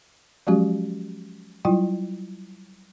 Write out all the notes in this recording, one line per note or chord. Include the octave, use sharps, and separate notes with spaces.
F3 F#3 G#3 C#4 F#4 G4
F#3 G3 E4 F4 G5